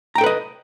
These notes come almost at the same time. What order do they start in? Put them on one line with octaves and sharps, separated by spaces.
A#5 G5 A4 B4 D#5